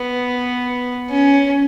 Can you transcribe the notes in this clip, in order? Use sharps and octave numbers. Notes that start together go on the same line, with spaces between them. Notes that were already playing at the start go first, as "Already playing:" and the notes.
Already playing: B3
C#4